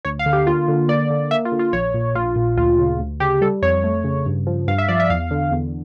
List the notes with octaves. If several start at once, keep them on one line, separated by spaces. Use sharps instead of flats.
D2 C#5
F5
D3
G4
A#3 F4
D3
A#3 D5
D3
A#3 E5
F4
D3
F4
A#1 C#5
A#2
A#1 F4
A#2
D2 F4
C#3
D2
C#3 G4
G3 A4
F2 C#5
A3
C#3
G2
F3
G2 F5
E5
F3 D5
E5
E2 F5
D3
E2